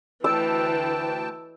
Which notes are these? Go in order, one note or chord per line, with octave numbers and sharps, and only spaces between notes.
D2 E3 G5 A5 E6